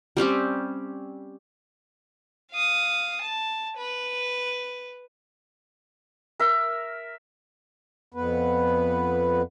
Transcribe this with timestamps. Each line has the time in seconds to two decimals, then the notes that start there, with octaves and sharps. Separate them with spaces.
0.17 G3 C4 C#4 G4
2.52 F5 D#6
3.22 A5
3.77 B4
6.40 A#4 E5
8.14 F2 B3 B4